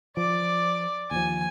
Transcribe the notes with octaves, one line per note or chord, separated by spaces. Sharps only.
F3 D5 D6
D#2 F3 G#5